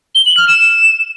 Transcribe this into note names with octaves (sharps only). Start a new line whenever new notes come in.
G7
F#7
F6
E7